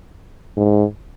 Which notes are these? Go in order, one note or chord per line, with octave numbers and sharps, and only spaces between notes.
G#2